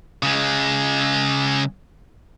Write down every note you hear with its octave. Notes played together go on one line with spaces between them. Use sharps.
C#3 G#3